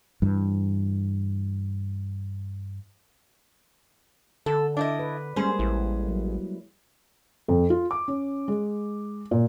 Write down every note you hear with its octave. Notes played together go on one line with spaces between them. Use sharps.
G2 E3
D3 A4
D4 E4 D5 D#5
B4
G3 G#3 A#3 C#4 G#4 C5
A1 E4
F#3
F2
F4
D6
C#4
G#3
A#2